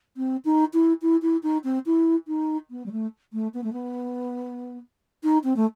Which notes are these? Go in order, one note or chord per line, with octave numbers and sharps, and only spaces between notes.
C4
D#4
E4
E4
E4
D#4
C4
E4
D#4
B3
G3
A3
A3
B3
A3
B3
D#4
C4
A3